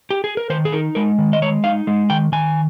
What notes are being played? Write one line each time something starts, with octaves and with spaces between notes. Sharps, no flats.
G4
G#4
A#4
D#3 C5
G#4
D#4 A#4
G#3 A#4
D#3
D#5
G#3 C#5
D#4 F5
G#3
D#3 G5
D#3 G#5